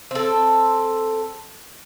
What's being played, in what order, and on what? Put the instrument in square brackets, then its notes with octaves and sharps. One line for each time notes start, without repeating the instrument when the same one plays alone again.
[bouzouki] C4 A4